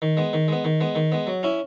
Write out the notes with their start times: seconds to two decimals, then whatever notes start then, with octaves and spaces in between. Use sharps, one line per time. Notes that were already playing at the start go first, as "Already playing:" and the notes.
0.02 D#3
0.17 G#3 B3
0.33 D#3
0.48 G#3 B3
0.64 D#3
0.81 G#3 B3
0.95 D#3
1.12 G#3 B3
1.27 F#3
1.43 C#4 E4